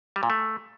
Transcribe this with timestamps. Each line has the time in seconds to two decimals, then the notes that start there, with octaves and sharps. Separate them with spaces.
0.16 G3
0.23 A#2
0.30 A3